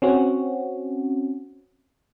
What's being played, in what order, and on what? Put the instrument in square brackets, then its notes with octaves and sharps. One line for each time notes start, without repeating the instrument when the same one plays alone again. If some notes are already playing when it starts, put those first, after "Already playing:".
[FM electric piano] C4 C#4 F#4